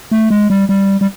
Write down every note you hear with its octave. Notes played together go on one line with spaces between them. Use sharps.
A3
G#3
G3
G3
G3